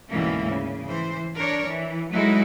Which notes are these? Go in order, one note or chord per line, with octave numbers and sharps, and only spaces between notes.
D2 G#2 B2 E3 A#3 C#4
C#3
E3 C5
D4 A#4 C#5 D5
E3
F#3 G#3 A3 D#4 E4 F#4